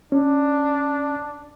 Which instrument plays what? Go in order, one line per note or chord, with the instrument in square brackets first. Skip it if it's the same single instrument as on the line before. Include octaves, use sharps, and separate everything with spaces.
[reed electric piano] C#4 [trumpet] D4